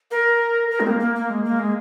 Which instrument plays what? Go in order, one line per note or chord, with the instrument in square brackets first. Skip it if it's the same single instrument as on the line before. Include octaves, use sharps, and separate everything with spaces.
[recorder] A#4
A#4
G#3
C4
A#3
A#3
A#3
G#3
A#3
G#3